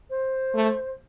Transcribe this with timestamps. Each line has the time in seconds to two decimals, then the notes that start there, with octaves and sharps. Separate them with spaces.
0.10 C5
0.55 A3